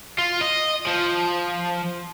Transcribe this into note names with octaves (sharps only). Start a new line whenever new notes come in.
F4
D#5
F3